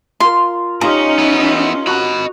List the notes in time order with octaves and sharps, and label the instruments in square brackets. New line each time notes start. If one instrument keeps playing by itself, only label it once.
[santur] F4 A#4 [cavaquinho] C6
[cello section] C#4 D#4 [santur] F4 G4 D#5 [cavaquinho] A#5
[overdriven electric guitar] B3 E4
[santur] F#4 A#5 [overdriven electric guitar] D#5 B5